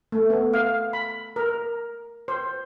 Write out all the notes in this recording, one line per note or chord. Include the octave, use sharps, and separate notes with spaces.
A3
B3
F5
B5
A#4
C5